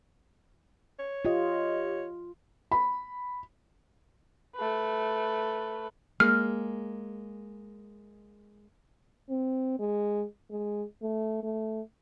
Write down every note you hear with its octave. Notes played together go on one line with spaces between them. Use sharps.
C#5
F4 G4 D#5
B5
A3 B4
G#3 A#3 F6
C4
G#3
G#3
A3
A3